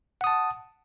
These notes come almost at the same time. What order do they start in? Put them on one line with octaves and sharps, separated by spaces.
F#5 D#6 A5